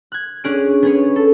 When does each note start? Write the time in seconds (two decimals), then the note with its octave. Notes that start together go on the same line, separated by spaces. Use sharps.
0.12 F#6 G#6
0.44 C#4 D4 G#4 F#6 D7
0.83 B3 G#4 C#5
1.16 A4